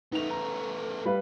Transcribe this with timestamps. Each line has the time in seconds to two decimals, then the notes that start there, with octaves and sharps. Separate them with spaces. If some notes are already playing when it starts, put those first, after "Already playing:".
0.12 A3 B3 D#4 F7
0.30 A#5
1.05 G3 B4 F5